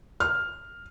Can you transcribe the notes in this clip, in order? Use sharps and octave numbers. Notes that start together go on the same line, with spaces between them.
F6